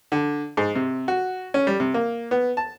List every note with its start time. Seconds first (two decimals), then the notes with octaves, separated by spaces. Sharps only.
0.12 D3
0.57 G#2
0.75 C3
1.08 F#4
1.54 C#4
1.67 G3
1.80 C3
1.94 A#3
2.31 B3
2.57 A5